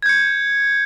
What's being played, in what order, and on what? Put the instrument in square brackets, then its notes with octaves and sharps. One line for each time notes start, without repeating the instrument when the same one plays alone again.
[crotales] G#6
G6
C#7